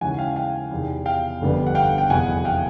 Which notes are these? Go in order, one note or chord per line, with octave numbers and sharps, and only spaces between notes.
D#2 C#3 E3 G#3 C#4 F#5 G#5
F5 G5
F5 G5
E2 C3 D#3
F5 G5
G1 F2 D3 G3 B3
F#5
F5 G5
G5
F1 E2 B2 F#5 G#5
F5 G5